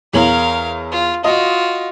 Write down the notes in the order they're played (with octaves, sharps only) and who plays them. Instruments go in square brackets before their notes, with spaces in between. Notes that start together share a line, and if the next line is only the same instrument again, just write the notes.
[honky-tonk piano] E2 C#5 F#7 [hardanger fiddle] A#4 F5
[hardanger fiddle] F4
[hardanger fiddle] F4 F#4 [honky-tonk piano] D#5